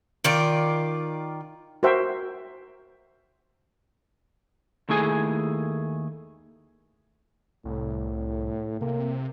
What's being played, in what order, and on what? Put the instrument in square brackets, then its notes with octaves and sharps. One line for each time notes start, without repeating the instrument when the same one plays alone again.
[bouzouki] D#3 F4 D5
[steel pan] F#4 A#4 C5 E5 G5
[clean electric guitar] D#2 A3 E4 G#4 G#5
[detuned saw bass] C2 [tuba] A2
[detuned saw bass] C3 [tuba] A#3